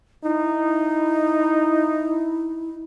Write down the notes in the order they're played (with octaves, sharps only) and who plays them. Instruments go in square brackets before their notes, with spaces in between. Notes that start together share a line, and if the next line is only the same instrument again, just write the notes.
[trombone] D#4 [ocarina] E4